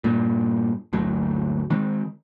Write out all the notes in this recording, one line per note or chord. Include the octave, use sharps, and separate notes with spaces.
G2 A#2
G1 D2 F#3
D#3 G#3 C4